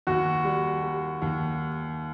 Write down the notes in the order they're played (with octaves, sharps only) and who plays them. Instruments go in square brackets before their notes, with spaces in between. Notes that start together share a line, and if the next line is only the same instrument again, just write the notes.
[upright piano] D#2 [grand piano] F#4
[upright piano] G3
G3
D#2